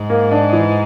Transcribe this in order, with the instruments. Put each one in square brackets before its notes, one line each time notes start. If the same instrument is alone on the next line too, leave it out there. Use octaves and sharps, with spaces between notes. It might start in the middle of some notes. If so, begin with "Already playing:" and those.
Already playing: [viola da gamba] G#2
[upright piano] A#3
D4
E3